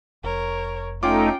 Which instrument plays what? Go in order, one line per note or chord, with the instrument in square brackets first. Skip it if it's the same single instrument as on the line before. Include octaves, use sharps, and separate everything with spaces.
[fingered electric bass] F1 [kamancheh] A#4 C#5
[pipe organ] A3 D#4 [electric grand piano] C#4 F4 D6 [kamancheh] G5